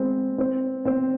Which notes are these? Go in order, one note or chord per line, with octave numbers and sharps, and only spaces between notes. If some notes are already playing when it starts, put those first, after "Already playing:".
Already playing: G#3 C4
C4
C4